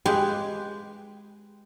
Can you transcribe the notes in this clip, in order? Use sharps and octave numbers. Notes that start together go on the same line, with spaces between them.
G#3 G4 B4 G5 G#5